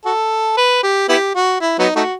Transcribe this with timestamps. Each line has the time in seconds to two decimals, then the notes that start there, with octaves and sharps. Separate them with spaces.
0.05 F#4 A4
0.57 B4
0.83 G4
1.09 B3 E4 G4
1.35 F#4
1.61 E4
1.79 F#3 B3 D#4
1.96 A3 D#4 F#4